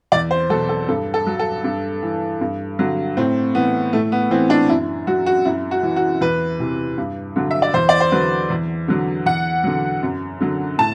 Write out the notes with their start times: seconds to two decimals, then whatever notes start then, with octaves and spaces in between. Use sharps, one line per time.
0.12 E2 D5
0.31 C5
0.50 F#3 A4
0.53 B2
0.69 A4
0.88 G2 A4
1.14 A4
1.27 F#3
1.39 A4
1.64 G2
2.03 E3
2.41 G2
2.79 D3 F#3
3.17 A2 C4
3.55 E3 B3
3.93 A2 A3
4.12 B3
4.31 E3 C4
4.50 D4
4.69 F#2 E4
5.07 F#3 F#4
5.26 F#4
5.45 F#2 E4
5.71 F#4
5.83 E3
5.96 F#4
6.21 E2 B4
6.59 C3 E3
6.98 G2
7.36 D3 F#3
7.51 E5
7.62 D5
7.74 E2 C5
7.89 D5
8.00 C5
8.12 D3 F#3 B4
8.50 E2
8.88 D3 F#3
9.26 E2 F#5
9.64 D3 F#3
10.03 F#2
10.41 D3 F#3
10.78 A2 A5